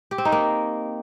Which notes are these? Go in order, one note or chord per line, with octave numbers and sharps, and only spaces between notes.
G4
C4
D#4
A#3